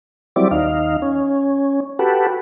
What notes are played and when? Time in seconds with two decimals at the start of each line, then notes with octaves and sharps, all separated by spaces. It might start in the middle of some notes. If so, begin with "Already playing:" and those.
0.36 F#3 G3 C4 E4 D5
0.51 D#2 D#4 F5
1.02 C#4
1.99 F#4 G4 A4 B4